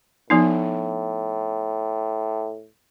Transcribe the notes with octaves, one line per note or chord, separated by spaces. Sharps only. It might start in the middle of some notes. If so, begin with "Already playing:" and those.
A2 F3 B3 D#4